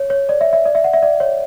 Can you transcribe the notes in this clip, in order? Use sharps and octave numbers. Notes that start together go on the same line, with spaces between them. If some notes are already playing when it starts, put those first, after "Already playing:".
Already playing: C#5
C#5
D5
E5
E5
D5
E5
F#5
E5
D5
C#5